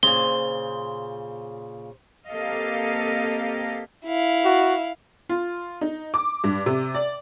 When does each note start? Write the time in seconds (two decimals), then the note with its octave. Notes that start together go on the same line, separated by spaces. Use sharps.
0.03 A#2 C#3 C5 G7
2.27 A#3 C4 G4 A4 D#5 F5
4.06 E4 F5
4.45 F#4
5.29 F4
5.81 D#4
6.14 D6
6.44 G2
6.66 C3
6.95 D5